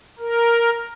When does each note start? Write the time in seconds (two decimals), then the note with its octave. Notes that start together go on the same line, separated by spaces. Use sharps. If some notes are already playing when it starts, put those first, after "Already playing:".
0.19 A#4